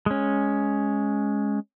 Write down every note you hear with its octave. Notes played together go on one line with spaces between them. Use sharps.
G#3 C#4